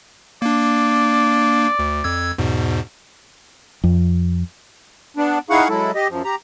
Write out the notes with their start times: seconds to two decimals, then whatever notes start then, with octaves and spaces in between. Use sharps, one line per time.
0.42 A#3 D4 D5
1.79 D2
2.04 F2 E6 G#6
2.38 E2 G#2 B2
3.84 F2
5.17 B3 D4
5.50 D#4 E4 G#4 F5 F#5 C#6
5.69 F#3 G#3 E4 A4
5.95 G4 D#5
6.09 F#2 F3
6.25 G4 A#5